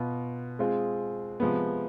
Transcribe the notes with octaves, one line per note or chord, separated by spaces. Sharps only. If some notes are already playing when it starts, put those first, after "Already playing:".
Already playing: B2 B3 F4
G#3 C4 F4 G#4
C3 F3 G#3 B3